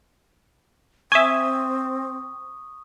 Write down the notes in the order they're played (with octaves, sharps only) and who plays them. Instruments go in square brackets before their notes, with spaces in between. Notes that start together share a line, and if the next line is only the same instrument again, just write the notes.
[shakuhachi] C4 [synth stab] E5 G#5 [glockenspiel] C#6 D#6